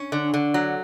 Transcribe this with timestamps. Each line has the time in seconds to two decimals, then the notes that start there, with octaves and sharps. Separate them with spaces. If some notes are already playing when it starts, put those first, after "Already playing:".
Already playing: C#4
0.12 D3
0.34 D3
0.54 F#3